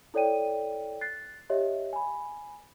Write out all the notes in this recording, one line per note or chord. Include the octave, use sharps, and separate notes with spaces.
E4 A4 C#5 D5 G5 D#7
F#6 A6 C7
G4 C#5 D#5 E5
G#5 B5